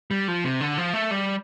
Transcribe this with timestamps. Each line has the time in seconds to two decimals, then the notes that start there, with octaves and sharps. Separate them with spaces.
0.11 G3
0.28 F3
0.44 C3
0.61 D3
0.78 F3
0.94 A3
1.11 G3